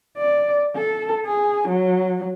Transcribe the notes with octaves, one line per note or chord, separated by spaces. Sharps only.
D5
A4
G#4
F#3